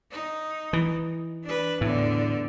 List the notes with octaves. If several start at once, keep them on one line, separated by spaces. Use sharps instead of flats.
D#4
E3
D4 B4
E2 A2 D3